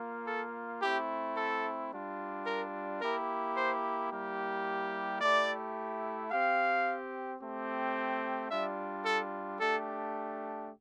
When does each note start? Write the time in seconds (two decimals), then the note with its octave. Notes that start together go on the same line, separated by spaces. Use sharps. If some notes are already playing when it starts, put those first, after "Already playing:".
Already playing: A#3 F4
0.27 A4
0.82 A3 C4 E4 G4
1.37 A4
1.92 G3 D4 F4
2.46 A#4
3.01 A#3 E4 G4 A#4
3.57 C5
4.11 G3 A#3 E4 G4
5.21 A3 E4 G4 D5
6.31 C4 G4 F5
7.41 A3 C4 G4
8.51 G3 D4 F4 E5
9.05 A4
9.60 A3 D4 G4 A4